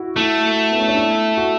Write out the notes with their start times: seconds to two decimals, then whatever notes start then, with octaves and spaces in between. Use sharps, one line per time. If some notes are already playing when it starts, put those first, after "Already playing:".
Already playing: E4 F#4
0.16 A3 E4
0.72 B3
0.80 C#4
0.88 D4
0.97 E4
1.37 F#4